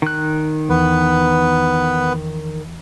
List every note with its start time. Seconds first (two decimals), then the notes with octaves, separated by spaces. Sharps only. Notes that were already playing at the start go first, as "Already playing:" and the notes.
0.02 D#3 F#6
0.69 E2 B3 B4